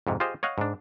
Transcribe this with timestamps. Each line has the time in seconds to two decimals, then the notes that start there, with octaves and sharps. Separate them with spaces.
0.07 F2 G#2 C3
0.20 F4 G4 G#4 C5 D#5
0.43 C#5 D#5 F5 F#5
0.58 G#2 D4